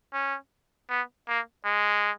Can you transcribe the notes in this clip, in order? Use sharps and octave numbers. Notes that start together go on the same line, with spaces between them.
C#4
B3
A#3
G#3